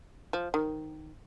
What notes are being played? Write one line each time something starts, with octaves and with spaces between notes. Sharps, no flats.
F3
D#3